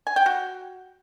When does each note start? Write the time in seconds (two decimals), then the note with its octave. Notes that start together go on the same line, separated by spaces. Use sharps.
0.07 G#5
0.16 G5
0.26 F#4